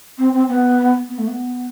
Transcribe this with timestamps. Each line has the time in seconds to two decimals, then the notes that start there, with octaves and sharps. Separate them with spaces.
0.18 C4
0.33 C4
0.48 B3
1.09 B3
1.18 A3
1.28 B3